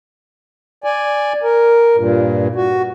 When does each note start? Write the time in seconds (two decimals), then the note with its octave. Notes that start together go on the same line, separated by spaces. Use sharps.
0.84 D5 G#5
1.43 A#4
1.96 G2 A#2
2.55 F#4